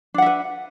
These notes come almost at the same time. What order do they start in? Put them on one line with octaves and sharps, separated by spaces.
D4 F#5 E5 B4